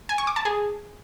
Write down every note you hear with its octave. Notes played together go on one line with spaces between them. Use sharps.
G#5
C#6
D6
A5
G#4